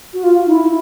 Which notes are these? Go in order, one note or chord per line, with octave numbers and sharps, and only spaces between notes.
F#4
F4
D#4
E4